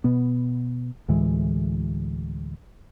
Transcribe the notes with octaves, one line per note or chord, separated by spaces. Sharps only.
B2 B3
D2 A2 E3 G#3